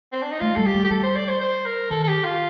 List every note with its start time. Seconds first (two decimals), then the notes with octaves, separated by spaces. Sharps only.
0.12 C4
0.22 D4
0.31 D#4
0.40 A3 F4
0.56 G3 A4
0.66 G4
0.74 G3
0.85 G4
0.90 G3 A4
1.03 C5
1.16 D5
1.28 C5
1.41 C5
1.65 A#4
1.90 D#3 A4
2.03 A4
2.08 G4
2.24 F4